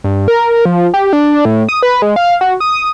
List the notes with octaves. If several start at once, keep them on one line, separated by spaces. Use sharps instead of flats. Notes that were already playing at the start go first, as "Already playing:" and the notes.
G2
A#4
F3
G4
D4
A2
D#6
B4
G#3
F5
F#4
D#6